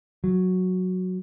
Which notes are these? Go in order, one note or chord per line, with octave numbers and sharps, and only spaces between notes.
F#3